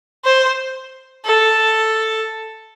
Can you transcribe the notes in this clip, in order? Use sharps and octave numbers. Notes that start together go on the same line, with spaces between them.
C5
A4